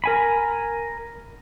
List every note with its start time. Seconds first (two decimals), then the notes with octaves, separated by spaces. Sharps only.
0.04 A#4 G#5 B5